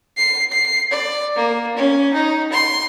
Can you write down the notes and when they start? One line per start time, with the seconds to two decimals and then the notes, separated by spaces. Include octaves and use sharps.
0.17 C7
0.52 C7
0.91 D5
1.36 A#3
1.77 C#4
2.13 D#4
2.52 C6